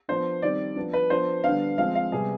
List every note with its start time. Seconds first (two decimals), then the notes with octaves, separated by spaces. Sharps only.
0.08 F3 B3 D4 C5
0.42 D#3 G3 C4 D5
0.76 F3 B3 D4
0.93 B4
1.10 F3 B3 D4 C5
1.44 D3 G3 B3 D4 F5
1.78 F3 G#3 C4 F5
1.95 F5
2.12 C3 G3 B3 G#4